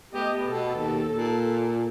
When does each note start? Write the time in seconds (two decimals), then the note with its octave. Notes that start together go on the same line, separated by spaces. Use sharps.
0.11 A3 B3 G4 D#5
0.44 B2 A4
0.75 D#2
1.09 A#2